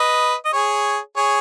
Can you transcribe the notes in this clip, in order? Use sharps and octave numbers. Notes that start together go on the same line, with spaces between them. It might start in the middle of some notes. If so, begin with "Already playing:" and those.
Already playing: B4 D#5
D#5
G#4 C#5
G#4 C#5